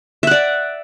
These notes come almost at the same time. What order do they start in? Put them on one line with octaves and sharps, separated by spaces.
E5 F#5 D5